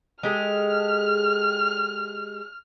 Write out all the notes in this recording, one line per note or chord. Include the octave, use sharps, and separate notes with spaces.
G#3 G4 A4 F6